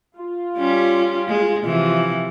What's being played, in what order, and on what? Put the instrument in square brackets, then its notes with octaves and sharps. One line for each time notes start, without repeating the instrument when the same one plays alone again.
[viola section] F4
[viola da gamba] G3 C#4 G4
G#3
C3 E3 F3